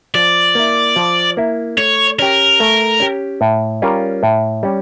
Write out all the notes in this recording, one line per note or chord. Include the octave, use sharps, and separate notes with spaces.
F3 D5
A#3 E4
F3
A#3 E4
A3 C#5
C#4 G4 A#4
A3
C#4 G4
A2
G3 C#4 F4 A#4
A2
G3 C#4